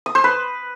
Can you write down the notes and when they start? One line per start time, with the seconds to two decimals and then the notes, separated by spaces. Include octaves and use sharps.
0.06 D#6
0.15 C5
0.24 B4